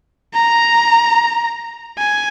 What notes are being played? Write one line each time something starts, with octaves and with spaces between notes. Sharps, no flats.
A#5
G#5